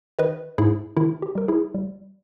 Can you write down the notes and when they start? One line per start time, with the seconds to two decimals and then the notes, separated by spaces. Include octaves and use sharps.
0.19 D#3 B4 D#5
0.58 G#2 E4 G#4
0.97 D#3 E4
1.22 G4
1.35 G3 A#4
1.48 E4 G#4
1.75 G3